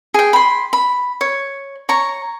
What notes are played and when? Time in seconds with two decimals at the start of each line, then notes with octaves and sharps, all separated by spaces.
0.14 G#4 G5
0.33 B5 C6
0.73 B5
1.21 C#5
1.89 C#5 A#5 C#6